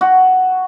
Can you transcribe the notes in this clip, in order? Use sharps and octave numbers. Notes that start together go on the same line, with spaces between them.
F#4